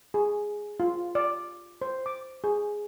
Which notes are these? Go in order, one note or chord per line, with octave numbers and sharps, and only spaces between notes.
G#4
F4
D5
C5
D6
G#4